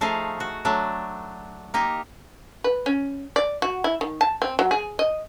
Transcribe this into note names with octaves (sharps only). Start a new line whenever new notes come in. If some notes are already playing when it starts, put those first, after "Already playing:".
F3 A3 D#4 G#4 F5
F#4
F#3 A3 D4
A#3 D#4 G4
B4
C#4
D5
F#4
E4
D#3
A5
C4
F#3
G#4
D#5